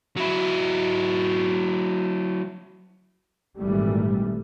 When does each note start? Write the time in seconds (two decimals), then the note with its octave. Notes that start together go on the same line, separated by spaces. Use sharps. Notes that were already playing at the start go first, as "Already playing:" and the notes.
0.17 F#3 E4
3.57 G#1 A#2 E3 G3 A3